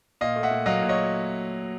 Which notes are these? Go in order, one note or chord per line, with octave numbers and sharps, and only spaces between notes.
A#2 D#5 F5
A3
E5 F#5
A#2
F#3 D#5 F5
A#2
C#5 D#5